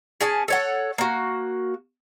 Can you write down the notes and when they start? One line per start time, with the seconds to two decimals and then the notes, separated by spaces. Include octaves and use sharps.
0.21 C#4 G#4 G#5 A5
0.48 A4 C#5 F#5
0.98 A#3 F#4